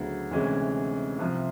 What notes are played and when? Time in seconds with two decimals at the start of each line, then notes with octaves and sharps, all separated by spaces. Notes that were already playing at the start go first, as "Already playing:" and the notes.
Already playing: D2 C#3 F#3 B3
0.31 D2 C3 E3 G#3 C#4
1.19 C2 C3 F3